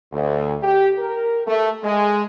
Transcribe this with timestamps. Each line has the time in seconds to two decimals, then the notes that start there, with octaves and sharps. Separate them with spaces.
0.12 D2
0.62 G4
0.99 A#4
1.47 A3
1.84 G#3